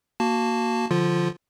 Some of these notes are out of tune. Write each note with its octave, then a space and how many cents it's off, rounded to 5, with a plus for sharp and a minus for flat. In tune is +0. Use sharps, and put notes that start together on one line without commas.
A#3 +0 F#4 +0 A5 +0
D3 +0 F3 +0 F4 +0